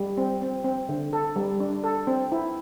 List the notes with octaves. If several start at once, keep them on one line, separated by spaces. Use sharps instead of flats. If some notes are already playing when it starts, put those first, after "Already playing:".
Already playing: G3
C4
C4
C4
D3
A4
G3
D4
A4
C4
E4